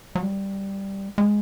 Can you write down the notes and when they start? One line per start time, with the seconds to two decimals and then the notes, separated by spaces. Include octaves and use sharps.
0.15 F#3
0.23 G3
1.18 G#3